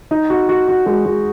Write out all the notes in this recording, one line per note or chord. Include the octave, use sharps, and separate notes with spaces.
D#4
F#4
F#4
F#4
G#3
G#3